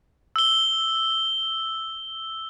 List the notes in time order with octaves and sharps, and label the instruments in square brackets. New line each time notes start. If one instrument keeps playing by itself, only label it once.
[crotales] E6 G7